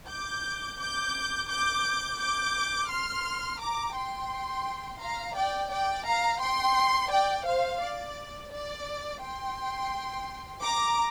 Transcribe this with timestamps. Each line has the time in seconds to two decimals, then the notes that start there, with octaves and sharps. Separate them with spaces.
0.09 D6 G6
0.79 D6 G6
1.50 D6 G6
2.20 D6 G6
2.89 C6 F6
3.60 A#5 D6
3.95 G5 C6
5.00 F5 A#5
5.35 D5 G5
5.71 D5 G5
6.06 F5 A#5
6.40 G5 C6
7.11 D5 G5
7.46 C5 F5
7.81 D5
8.51 D5
9.21 G5 C6
10.62 A#5 D6